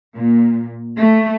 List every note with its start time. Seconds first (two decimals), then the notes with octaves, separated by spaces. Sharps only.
0.15 A#2
0.97 A3